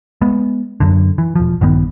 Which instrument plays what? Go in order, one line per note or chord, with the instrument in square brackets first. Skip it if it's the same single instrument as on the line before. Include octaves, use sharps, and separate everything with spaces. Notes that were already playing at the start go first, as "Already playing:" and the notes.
[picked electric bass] G#3 B3
F#2 D3
E3
E1 F3
A#1 G2 D#3 B3